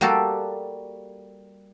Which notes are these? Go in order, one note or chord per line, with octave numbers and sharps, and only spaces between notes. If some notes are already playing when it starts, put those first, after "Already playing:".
G3 A#3 F#4 G4 A4